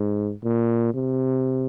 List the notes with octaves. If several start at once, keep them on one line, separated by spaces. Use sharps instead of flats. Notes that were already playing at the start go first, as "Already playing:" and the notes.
Already playing: G#2
A#2
C3